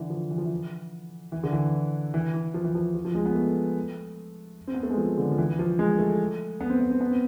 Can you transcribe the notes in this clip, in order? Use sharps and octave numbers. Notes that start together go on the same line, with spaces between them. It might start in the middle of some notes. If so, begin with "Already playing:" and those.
Already playing: D3 E3
F3
E3
F3
E3
E3
D3
E3
E3
E3
F3
E3
F3
F3
F3
G#3
B3
A3
C4
B3
A3
G#3
F3
D3
F3
E3
F3
G#3
A3
B3
C4
B3
C4
B3
C4